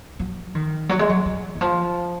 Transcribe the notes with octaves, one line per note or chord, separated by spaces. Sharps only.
F#3
D#3
F#3
G#3
F#3
F#3
D#3
F3